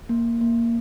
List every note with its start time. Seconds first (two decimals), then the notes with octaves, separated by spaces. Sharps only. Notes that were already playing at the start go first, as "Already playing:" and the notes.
0.09 A#3
0.41 A#3